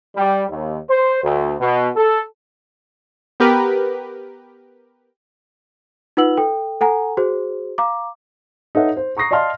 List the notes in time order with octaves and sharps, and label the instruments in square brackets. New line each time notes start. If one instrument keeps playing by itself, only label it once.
[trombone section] G3
D#2
C5
D2
B2
A4
[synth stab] B3 G4 A#4 B4
[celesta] D#4 F4 B4 F#5 E6 F#7
A4 G5
A4 F#5 G#5 A#5
F#4 G#4 C5
F5 A#5 D6
[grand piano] D#4 A4 B4 C#5 E5 F#5
C5
A#5 C#6 D#6 A#6 C7
D5 D#5 F5 A5 C6 F6